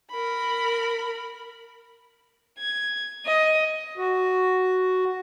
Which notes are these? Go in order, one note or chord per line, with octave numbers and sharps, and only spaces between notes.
A#4 B5
G#6
D#5
F#4